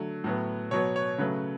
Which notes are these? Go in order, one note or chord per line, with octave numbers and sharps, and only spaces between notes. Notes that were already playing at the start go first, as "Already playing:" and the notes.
Already playing: D3 F#3 A3
A2 F#3 B3
B2 F#3 B3 C#5
C#5
C#3 F#3 A3 B4